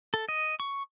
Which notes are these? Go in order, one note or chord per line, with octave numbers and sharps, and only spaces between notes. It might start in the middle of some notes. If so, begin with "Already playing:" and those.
A4
D#5
C#6